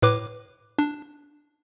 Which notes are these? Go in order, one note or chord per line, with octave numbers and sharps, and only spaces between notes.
A2 B4 D6
D4